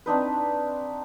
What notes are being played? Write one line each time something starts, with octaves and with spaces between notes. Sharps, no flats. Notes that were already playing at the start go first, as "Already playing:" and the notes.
C4 D4 D#4 B4